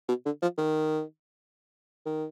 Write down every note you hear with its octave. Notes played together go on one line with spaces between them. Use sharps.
B2
D3
F3
D#3
D#3